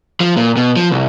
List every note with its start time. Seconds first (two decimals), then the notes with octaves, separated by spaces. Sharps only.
0.20 F3
0.37 A#2
0.57 B2
0.76 F3
0.91 C2